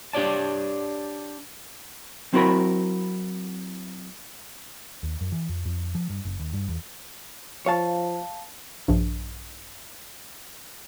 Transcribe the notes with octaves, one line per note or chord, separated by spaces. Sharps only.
D4 G4 C#5 D5 A5
F#3 C4 E4 F#4 A#4 B5
D#2
F#2
E3
F2
F2
F3
G2
F#1
D#2
G2
E2
F3 C#5 F5 A5
A#1 G2